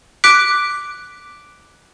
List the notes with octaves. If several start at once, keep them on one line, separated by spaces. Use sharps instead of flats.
D6 F#6 B6 D7